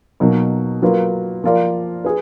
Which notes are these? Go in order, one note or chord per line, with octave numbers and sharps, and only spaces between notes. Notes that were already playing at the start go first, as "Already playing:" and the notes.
B2 F#3 A#3 D#4 A#4
F#3 A#3 F4 B4
F3 A#3 F4 A#4 D5
G#4 B4